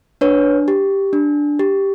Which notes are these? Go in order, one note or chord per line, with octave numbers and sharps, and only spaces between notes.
D4 B4 C#5
G4
D4
G4